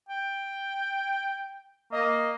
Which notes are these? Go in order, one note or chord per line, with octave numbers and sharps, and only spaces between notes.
G5
A#3 D#5